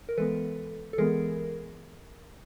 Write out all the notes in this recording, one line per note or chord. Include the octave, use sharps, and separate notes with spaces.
A#4
E3 G#3 B3 A4 B4
A4
E3 G#3 B3 G#4 A#4